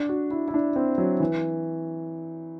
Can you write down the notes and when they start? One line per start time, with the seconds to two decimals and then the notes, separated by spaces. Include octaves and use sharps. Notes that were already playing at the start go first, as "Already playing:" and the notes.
Already playing: D4
0.09 F#4
0.31 E4
0.48 E4
0.54 D4
0.76 C4
0.98 F#3
1.20 E3